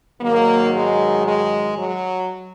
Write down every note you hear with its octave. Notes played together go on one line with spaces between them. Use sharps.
G#2 D#3 F#3 A#3
G#3
G#3
F#3